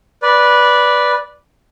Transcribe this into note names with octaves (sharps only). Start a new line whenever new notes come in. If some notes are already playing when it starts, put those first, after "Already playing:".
B4 D5